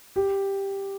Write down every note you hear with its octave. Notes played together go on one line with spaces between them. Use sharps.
G4